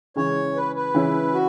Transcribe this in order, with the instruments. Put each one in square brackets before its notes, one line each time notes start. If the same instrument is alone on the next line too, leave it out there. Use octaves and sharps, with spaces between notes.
[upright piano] C#3 E3 G#3 C#4 [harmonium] C#5
[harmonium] B4
B4
[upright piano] C#3 E3 G#3 C#4 E4
[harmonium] F#4